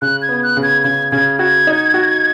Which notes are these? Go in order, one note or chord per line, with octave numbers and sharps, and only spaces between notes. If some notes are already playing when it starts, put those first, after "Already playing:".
C#3 F#6
G#6
B3
F#6
C#3
G#6
C#3 G#6
C#3 G#6
F#4 G#6
D#4
F#4